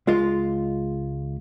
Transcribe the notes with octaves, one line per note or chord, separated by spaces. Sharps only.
C#2 G#3 F4